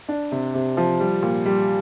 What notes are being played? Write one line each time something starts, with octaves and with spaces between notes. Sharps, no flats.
D4
C3
C3
F3
G3
A#2
G3